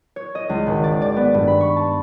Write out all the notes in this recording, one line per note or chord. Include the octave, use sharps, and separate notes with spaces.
C#5
D#5
C#2
G#1
D5
D5
B3
G2
B5
C#6
A5